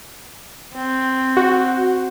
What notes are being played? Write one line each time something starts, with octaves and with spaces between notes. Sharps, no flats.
C4
F#4